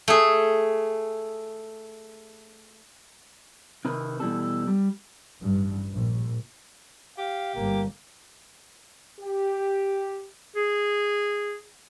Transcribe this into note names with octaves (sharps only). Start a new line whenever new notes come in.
A3 G#4
C3 D#3 B4
B2 E3 G3 A4
G3
A1 G2
A#1
G4 F5
G1 A#3
G4
G#4